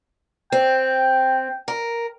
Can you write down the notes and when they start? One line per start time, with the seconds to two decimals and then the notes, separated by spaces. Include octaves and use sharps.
0.52 C4 G5
1.68 A#4